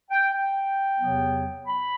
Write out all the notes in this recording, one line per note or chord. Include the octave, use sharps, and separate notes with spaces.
G5
G5
E2 C3 F#3 B3
B5